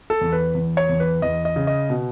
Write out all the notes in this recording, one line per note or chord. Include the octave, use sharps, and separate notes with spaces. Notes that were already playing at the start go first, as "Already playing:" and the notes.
A4
E2
B4
E2
C#5
E2
B4
E2 D#5
D#5
C#3
D#5
B2